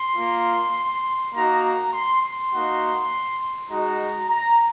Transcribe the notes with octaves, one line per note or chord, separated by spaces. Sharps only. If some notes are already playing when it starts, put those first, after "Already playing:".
Already playing: C6
A#3 F4
A#3 D#4 F#4 A#5
A#5
C6
C6
A#3 D#4 F#4
G#3 D#4 F#4 A#5
A#5